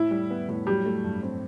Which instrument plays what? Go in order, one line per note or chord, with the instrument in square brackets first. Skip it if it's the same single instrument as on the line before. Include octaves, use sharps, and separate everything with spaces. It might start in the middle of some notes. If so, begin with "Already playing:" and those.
Already playing: [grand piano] A2 [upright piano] E4
[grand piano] G3
B3
A2
[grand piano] F#3 [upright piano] G3
[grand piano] A3
G2
C4